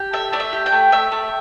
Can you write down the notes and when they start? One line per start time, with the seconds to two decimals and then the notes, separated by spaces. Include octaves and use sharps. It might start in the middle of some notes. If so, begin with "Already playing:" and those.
Already playing: G4
0.13 A3 E5
0.33 A3 D5
0.40 E5
0.53 G4
0.66 G5
0.72 A3
0.92 A3 E5
1.12 A3